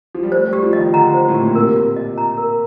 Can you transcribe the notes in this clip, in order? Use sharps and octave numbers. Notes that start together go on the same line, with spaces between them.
F3
G3
A3 C5
G3
G4
F3
D#5
D#3
D3 A#5
C5
A2
G4
A#2
C3 A#4
F4
D#5
A#5
A#4